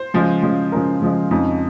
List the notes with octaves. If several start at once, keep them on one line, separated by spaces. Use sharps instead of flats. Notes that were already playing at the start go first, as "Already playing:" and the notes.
Already playing: C5
C#3 F3 G#3
C#3 F3 G#3
C#3 F3 G#3 A#4
C#3 F3 G#3
F2 C#3 G#3 D#4